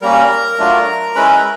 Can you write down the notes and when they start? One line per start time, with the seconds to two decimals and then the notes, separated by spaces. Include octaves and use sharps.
0.02 G3 A#3 C#4 A#4 A#5
0.59 F#3 A3 D4 F4
1.15 G#3 C#4 E4 B4 B5
1.29 A#4 A#5